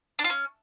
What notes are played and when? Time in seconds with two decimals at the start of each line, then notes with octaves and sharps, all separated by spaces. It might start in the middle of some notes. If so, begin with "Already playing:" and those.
0.19 D4
0.24 F4
0.30 C#4